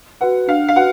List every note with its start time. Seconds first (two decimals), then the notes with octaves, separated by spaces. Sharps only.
0.21 F#4 B4 F#5
0.48 D4 F5
0.68 F5
0.76 F#4 B4 F#5